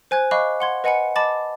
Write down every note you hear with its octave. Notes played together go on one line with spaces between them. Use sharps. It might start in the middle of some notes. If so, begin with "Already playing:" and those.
C5 G#5 F#6 G#6
D#5 F5 B5 C#6 D6 F#6
F#5 C6 G#6
B4 D#5 F#5 G#5 B5 C#7
D#5 A5 B5 D6 A6